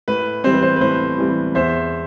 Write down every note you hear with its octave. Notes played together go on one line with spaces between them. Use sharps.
A2 B4
E3 G3 C4 C5
B4
C5
B4
A2 C5
E3 G3 C4
E2 C5 E5